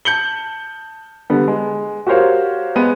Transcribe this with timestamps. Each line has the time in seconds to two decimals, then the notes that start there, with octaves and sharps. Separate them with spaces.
0.05 A5 G6 C#7 F#7 G7
1.30 D3 G3 B3
1.48 G#3
2.07 F#4 G4 A#4 C5 C#5 F5
2.76 G#3 B3 D#7